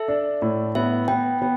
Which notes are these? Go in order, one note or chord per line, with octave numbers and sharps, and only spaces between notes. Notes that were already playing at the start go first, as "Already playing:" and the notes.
Already playing: A4 E5
D4
A2
B3 E5
B3 G5
B3